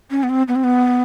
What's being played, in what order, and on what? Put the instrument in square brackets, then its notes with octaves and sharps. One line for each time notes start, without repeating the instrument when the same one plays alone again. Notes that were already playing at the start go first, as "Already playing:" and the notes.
[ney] C#4
B3
C4
B3
C4
B3